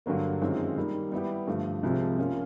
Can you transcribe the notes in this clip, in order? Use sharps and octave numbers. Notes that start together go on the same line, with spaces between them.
G2 D3 F#3 A#3
F#2 D#3 G#3 C4 F4
D#3 G3 A#3
G3 B3 E4 G4
G2 D3 F3 A3
C2 C3 F3 G#3
F3 A#3 C#4 F4